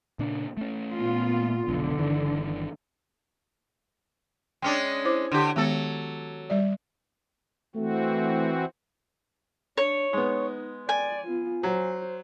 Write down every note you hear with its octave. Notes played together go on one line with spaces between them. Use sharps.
A#2 C#3 D4
A3 C#4
A#2 B3 F4
F1 B1 D3
G1 D#3 E3
G#3 C#4 D4 G5
E4 C5 D6
D3 G4
D#3 F#3 G#3 B3 A4
G3 D5
E3 A3 C4 F#4
D4 C#5
G#3 B3 D#4
D5 G#5
B3 F4
F#3 C5